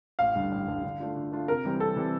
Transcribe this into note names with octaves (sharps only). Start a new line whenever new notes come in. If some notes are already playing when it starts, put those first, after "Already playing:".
A1 F5
G2 D3
A1
G2 D3
D3
A3 D4 F4
D3
A3 D4 F4
C3 A#4
E3 G3 C4 G4
C3 A4
E3 G3 C4 G4